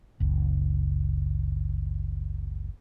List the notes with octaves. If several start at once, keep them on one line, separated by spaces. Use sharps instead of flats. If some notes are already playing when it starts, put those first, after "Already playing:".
F#1 C#2